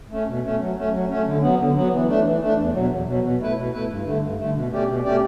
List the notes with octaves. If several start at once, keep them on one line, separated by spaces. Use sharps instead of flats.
A3 C#4
B2
A3 C#4
F#3
A3 C#4
F#3
A3 C#4
D3
F#3 B3
D3
F#3 B3
E3
A3 D4
E3
A3 D4
E2
B2 F#3
E2
B2 F#3
B2
A3 E4 B4
B2
A3 E4 B4
G2
D3 A3
G2
D3 A3
B2
A3 C#4 G4 D5
B2
A3 C#4 G4 D5